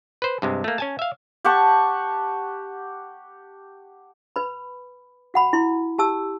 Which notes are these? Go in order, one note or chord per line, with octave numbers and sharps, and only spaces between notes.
B4 C5
G2 C3 G#3
A3 A#3
C#4 G#5 A5
E5 F5
G4 F#5 A5 C#6
B4 B5
F#4 F#5 B5
E4 C6
G4 A5 E6